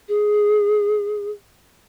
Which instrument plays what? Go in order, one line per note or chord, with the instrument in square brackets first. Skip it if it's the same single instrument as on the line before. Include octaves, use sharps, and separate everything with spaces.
[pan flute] G#4